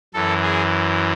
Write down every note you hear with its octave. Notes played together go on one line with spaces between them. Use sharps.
F#2 E3 A4
G#4